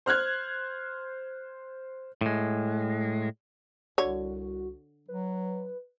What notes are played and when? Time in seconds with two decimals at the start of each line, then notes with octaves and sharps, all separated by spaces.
0.06 C5 F6 F#6 G#6
2.21 A2 G#3
3.98 C2 D3 F#4 C#5
5.08 F#3 B4